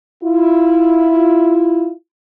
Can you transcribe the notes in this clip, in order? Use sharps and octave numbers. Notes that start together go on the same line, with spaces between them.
E4 F4